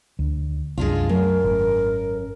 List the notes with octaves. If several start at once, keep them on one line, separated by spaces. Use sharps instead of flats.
D2
C2 F#2 G#3 D4 F4
F#2 A3 A#4
G#1